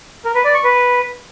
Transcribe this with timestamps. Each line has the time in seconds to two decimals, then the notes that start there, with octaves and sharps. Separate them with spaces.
0.25 A#4
0.35 B4
0.45 D5
0.54 C#6
0.64 B4